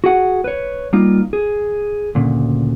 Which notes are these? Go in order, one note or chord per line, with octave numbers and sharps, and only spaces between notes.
F#4 G#4 F#5
B4 C#5
G3 A#3 D#4 F4
G#4
D2 A#2 C#3